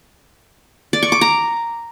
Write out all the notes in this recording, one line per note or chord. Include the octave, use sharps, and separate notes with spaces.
D5
C#6
D6
A#5